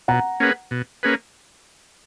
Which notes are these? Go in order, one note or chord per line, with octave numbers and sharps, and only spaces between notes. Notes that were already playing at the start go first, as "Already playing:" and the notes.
B2 F#5 A#5
A#3 C#4 G#4 B4
B2
A#3 C#4 G#4 B4